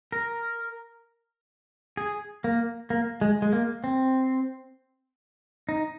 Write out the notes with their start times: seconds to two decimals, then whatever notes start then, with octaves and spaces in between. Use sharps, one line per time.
0.12 A#4
1.97 G#4
2.44 A#3
2.90 A#3
3.21 G#3
3.42 G#3
3.53 A#3
3.84 C4
5.69 D#4